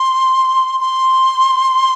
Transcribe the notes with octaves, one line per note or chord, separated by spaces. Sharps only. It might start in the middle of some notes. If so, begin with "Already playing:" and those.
Already playing: C6
C6